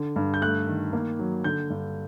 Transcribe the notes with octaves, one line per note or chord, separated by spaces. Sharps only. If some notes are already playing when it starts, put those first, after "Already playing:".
Already playing: D3
G2
G6
A3 F#6
D#3
A#3
F#3
D3 G6
G2